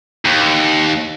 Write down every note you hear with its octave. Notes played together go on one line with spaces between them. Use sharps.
D#2